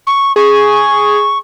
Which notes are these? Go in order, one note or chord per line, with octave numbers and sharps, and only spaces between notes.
C#6
G#4 C#6